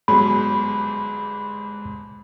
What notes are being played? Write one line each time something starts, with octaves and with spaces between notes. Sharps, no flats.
G1 G#2 F#3 B5